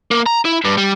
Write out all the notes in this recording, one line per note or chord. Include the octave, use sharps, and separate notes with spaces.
A#3
A#5
E4
G2
G3